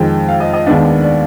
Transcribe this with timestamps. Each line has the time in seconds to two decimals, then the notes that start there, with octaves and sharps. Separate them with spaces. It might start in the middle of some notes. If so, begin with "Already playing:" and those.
Already playing: F2 D#3 G#3 G5
0.28 F5
0.40 D#5
0.54 D#5
0.66 D#2 D#3 G#3 B3 D4 D5
1.03 D5